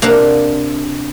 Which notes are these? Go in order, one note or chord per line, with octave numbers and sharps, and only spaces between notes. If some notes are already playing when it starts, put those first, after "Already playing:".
C3 A#3 D4 F5 F#5